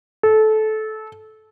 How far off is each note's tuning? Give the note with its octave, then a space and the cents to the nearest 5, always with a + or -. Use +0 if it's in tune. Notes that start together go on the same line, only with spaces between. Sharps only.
A4 -20